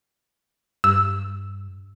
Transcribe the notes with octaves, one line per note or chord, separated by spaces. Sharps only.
G2 E6